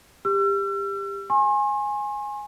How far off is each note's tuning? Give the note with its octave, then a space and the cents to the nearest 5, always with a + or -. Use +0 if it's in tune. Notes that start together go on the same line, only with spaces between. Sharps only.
G4 +25 E6 +45
G#5 +0 C6 +45